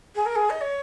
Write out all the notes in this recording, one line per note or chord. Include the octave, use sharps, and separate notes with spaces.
G#4
A#4
G#4
D#5
C#5